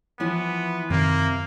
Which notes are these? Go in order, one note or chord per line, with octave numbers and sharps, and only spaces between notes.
E3 F3 B3 E4
F#2 C3 D#3 A#3 C4